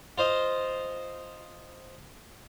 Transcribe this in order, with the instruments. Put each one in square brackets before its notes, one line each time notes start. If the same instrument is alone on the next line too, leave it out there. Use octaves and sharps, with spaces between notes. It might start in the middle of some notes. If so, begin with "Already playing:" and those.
[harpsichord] F4 C5 D#5